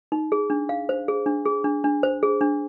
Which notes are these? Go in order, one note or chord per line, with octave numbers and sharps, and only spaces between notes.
D#4
G#4
D4
F5
C5
G#4
D4
G#4
D4
D4
C5
G#4
D4